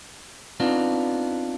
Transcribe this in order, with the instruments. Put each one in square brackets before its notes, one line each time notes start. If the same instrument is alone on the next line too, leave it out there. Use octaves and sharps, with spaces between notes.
[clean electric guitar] B3 C4 D4 D#4 F4